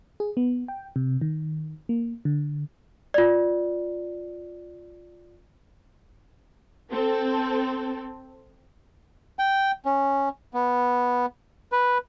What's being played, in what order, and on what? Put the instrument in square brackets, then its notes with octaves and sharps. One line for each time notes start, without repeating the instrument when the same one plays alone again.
[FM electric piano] G#4
B3
G5
C3
D#3
A#3
D3
[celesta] F4 D5
[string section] C4 A4
[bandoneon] G5
C#4
B3
B4